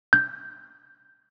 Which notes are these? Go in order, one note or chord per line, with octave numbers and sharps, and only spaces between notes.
G6